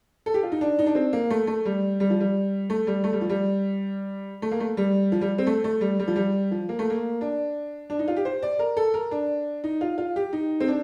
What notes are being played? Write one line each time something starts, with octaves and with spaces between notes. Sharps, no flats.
A4
G4
F4
D#4
D4
D#4
D4
C4
A#3
A3
A3
G3
G3
F3
G3
A3
G3
A3
G3
F3
G3
A3
A#3
A3
G3
F3
G3
C4
A3
A3
G3
G3
F3
G3
F3
A#3
A3
A#3
D4
D4
D#4
F4
G4
C5
D5
A#4
A4
A#4
D4
D#4
F4
F4
G4
D#4
C4
D4